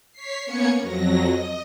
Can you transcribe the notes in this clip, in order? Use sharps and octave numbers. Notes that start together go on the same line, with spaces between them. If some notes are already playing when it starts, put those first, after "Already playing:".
C#5 B6 C7
A#3 B3 C#4 C#5 G#6 C#7
F2 F#3 A#6
D#5